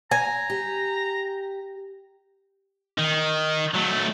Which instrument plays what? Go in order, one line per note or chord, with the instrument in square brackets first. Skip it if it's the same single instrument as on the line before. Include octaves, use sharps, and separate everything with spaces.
[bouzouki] G#5 [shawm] A#5
[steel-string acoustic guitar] G4
[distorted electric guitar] D#3
F#3 A3